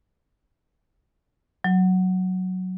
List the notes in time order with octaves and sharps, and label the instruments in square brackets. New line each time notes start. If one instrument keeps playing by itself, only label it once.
[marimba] F#3